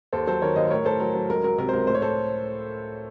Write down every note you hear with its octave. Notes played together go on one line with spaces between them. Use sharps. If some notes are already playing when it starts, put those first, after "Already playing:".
D#2 A4 C5
F#3 A4 C5
D#3 A#4 C#5
D#2 C5 D#5
A2 A#4 C#5
A2 A4 C5
F#3 A#4
F#3 A4
C#2 A#4
F#3 A#4
C3 A#4
C5
C#2 A#4
A2 C5
C#5
A2 A4 C5